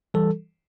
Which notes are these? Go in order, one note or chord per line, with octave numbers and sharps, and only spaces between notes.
E3 G3 A4